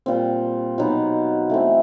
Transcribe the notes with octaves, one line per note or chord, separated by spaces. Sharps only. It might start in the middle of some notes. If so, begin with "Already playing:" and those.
A#2 G3 C4
B2 F#3 B3 D#4
E3 A3 C4